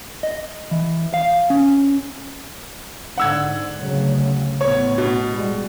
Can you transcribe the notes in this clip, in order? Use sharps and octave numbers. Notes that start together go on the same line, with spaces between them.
D#5
E3
F5
C#4
G#2 D3 F#5 E6 G#6
D2 C#3 F#3
A1 A2 B3 C#5
B2
G3 G#3